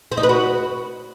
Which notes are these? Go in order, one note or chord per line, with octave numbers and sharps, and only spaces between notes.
C4
D#4
B4
F#4